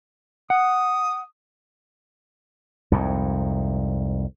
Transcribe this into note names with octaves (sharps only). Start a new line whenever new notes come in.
F#5 D#6
C2 F2 G#2